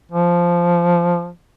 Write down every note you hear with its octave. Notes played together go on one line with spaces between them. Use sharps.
F3